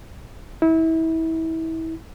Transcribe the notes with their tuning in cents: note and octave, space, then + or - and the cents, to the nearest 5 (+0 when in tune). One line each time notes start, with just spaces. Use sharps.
E4 -30